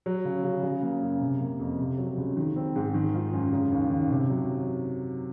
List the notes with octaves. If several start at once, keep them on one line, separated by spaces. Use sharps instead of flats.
F#3
C#3
C#3
C#3
A#3
F#2
C3
A#3
F2
C3
F#3
C#2
D#3
C4
G#2
D#3
F4
F#2
C#3
D#2
D#2
C3
F#3